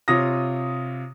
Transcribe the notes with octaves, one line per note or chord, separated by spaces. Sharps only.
C3 F4 C#5 D#6 A#6